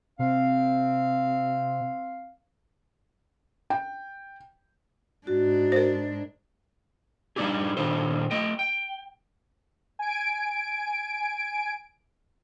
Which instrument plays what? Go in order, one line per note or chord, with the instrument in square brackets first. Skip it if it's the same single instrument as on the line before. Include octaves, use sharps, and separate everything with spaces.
[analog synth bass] C3 [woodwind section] C4 F5
[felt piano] G5
[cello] G#2 D4 [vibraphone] F#4
[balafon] A#4 C5
[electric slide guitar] G3 A3 D4 D#4 G4 G#4
A#2 D#3 D4 A4 C5
A3 D#5 G5
G5
[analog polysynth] G#5 D7